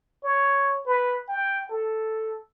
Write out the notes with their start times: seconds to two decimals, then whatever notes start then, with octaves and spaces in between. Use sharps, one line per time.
0.23 C#5
0.86 B4
1.29 G5
1.69 A4